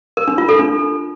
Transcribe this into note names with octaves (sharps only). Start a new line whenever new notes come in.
A#4
D4
F4
A4
D4